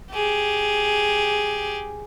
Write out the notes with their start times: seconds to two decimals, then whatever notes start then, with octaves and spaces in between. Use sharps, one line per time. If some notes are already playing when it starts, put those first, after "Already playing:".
0.12 G4 G#4